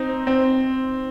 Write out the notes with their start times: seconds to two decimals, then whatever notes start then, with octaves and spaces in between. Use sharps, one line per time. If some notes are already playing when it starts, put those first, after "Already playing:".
Already playing: C4 D#4
0.27 C4